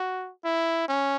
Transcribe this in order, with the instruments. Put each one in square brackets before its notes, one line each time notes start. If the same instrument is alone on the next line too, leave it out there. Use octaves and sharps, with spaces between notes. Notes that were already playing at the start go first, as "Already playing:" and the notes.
Already playing: [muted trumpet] F#4
E4
C#4